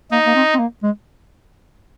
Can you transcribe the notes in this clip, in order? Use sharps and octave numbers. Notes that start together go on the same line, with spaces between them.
A#3 D#4
A#3
C4
C4
A#3
G#3